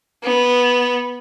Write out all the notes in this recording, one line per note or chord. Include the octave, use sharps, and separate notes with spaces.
B3